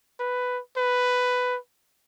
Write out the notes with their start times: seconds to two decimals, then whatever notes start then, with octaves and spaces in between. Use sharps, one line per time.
0.20 B4
0.77 B4